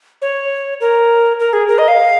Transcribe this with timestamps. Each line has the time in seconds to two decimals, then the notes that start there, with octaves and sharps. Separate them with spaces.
0.22 C#5
0.81 A#4
1.40 A#4
1.53 G#4
1.68 A#4
1.78 D#5
1.88 F5